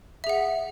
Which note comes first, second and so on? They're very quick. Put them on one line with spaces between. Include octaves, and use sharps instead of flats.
E5 G#4 F#5